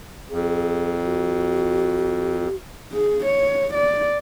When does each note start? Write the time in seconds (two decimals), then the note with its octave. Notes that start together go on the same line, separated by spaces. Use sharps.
0.30 F2 G#4
1.04 F#4
2.93 G#4
3.25 C#5
3.74 D5